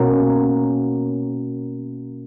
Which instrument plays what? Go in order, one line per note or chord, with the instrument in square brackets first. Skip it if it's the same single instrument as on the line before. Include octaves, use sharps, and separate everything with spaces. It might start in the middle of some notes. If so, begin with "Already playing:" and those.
Already playing: [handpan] B2 A#3 C#4 F#4 A#4